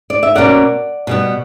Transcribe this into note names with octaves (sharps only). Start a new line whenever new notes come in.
D5
E5
B2 F#3 A#3 C#4 D5 F#5
B2 G3 B3